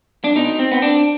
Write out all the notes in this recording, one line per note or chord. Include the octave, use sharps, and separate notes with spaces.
D4
B2 D#4
C4
B3
D4